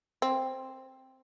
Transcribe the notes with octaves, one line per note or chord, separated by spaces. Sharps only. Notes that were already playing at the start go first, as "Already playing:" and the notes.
C4